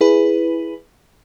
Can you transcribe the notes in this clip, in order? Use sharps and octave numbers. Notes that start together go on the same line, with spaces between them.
E4 G#4 B4